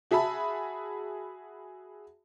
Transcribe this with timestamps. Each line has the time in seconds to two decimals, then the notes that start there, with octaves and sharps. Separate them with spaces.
0.11 F#4 G#4 E5 A5 B5